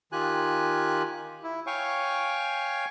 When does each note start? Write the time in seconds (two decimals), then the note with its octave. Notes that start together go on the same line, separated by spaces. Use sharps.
0.12 D#3 F4 G4 G#5 F#6
1.44 E4
1.67 C#5 F5 G5 G#5 C#6